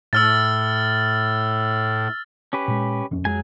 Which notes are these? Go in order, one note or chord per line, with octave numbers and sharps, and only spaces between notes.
A2 E6 F6 A6
C#4 G4 B4
A#2 G#3
D#1 F2 C#4
F2 F#3 G#3 G#4 G#5